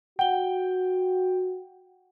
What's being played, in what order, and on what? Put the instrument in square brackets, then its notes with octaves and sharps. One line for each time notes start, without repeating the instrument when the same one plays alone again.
[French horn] F#4 [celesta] F#5 G7 [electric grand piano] G5